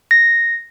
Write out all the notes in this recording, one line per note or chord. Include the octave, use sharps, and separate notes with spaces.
A#6